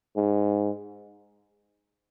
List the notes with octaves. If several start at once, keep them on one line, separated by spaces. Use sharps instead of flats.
G#2